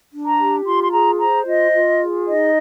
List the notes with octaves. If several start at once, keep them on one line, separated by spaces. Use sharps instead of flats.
D4
A#5
G4
F4 C6
C6
G#4 A#5
C5 A#5
F4 D#5
F4
G#4
D#4 D#5